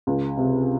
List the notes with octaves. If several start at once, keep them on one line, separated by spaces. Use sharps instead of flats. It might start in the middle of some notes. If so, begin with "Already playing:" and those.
C#2
C3